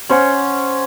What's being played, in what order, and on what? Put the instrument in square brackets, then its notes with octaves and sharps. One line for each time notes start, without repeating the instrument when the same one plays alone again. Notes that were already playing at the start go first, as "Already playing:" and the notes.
[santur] C#4 C5 C#5 F#5